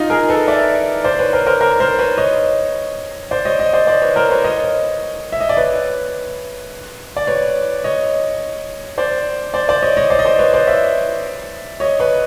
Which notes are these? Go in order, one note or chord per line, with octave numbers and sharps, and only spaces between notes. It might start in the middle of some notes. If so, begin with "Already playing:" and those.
Already playing: D#4 F4
G#4 A#4
A4 B4
D5 E5
C5 D5
B4 C#5
A#4 C5
A#4 C5
A#4 C5
A#4 C5
B4 C#5
C#5 D#5
C5 D5
C#5 D#5
C#5 D#5
C5 D5
C5 D5
B4 C#5
A#4 C5
B4 C#5
C#5 D#5
E5
D#5
D5
B4 C#5
D5
B4 C#5
C#5 D#5
C5 D5
C5 D5
C5 D5
C#5 D#5
C#5 D#5
C5 D5
D#5
C5 D5
B4 C#5
C5 D5
D5 E5
C#5 D#5
B4 C#5